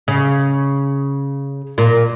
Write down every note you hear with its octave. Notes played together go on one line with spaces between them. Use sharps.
C#3
A#2